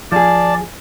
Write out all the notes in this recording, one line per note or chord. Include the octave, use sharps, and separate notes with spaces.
F3 G#4 D5 A5